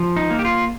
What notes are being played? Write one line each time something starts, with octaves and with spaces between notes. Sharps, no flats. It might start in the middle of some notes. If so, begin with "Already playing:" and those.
Already playing: F3
D#4
A#3
G4
F4